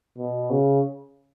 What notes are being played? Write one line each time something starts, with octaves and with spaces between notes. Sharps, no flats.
B2
C#3